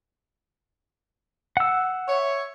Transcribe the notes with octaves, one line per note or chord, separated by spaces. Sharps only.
F#5 E6
C#5 E5